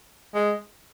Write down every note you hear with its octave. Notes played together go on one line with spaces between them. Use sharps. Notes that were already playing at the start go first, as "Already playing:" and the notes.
G#3